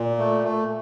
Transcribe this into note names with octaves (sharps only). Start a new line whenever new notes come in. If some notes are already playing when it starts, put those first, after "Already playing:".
Already playing: A#2
A3
A3